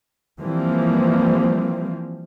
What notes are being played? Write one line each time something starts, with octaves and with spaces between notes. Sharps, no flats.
E3 F3 G3 A#3 C4